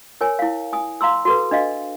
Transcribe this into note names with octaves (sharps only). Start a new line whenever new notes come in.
A#4 C#5 G#5
E4 F5
G#5 D#6
F5 A#5 C6 E6
F#4 A4 B4
D4 D#5 F5